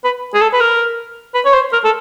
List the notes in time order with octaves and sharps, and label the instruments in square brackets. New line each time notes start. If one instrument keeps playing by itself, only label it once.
[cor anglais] B4
G#4
A4
B4
A#4
B4
C#5
C5
A#4
A4